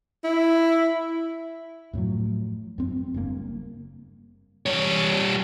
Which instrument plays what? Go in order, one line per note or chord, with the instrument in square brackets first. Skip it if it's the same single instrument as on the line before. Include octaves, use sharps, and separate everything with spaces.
[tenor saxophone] E4
[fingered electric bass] F#2 A2 F3 F#3
F#2 C4
F#1 G2 B2 A#3
[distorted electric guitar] G3 C#5